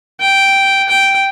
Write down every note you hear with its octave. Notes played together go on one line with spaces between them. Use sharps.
G5
G5